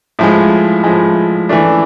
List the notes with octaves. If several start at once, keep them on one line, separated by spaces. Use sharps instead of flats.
A2 F3 G#3
A2 F3 G#3
E3 A3 D4